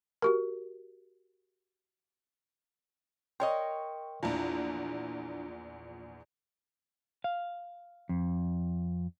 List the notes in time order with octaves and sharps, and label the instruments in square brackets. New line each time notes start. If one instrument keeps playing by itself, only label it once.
[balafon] F#4 G4 A#4
[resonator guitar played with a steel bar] A#4 C#5 D#5 [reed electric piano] G5 C6
[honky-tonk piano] A#1 E2 [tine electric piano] D4 E4 A#5 [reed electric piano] F4
[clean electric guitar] F5
F2